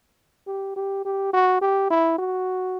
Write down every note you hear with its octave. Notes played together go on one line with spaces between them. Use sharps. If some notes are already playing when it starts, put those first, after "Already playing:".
G4
G4
G4
F#4
G4
E4
F#4